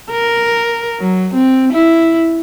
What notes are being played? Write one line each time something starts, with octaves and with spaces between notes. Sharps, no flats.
A#4
F#3
C4
E4